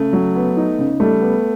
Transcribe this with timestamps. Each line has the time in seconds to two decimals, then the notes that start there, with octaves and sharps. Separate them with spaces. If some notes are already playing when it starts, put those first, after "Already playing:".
Already playing: C#3 A3
0.13 F#3
0.35 B3
0.57 D#4
0.79 C#3
1.00 G3 A3
1.21 B3